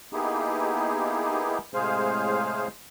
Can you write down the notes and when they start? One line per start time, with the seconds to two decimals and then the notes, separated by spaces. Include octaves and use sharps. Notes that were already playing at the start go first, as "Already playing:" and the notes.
0.13 A#3 B3 D#4 E4 G4 G#4
1.74 A2 C3 G#3 G#4 C5 F5